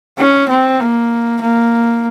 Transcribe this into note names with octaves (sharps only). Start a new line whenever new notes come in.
C#4
C4
A#3
A#3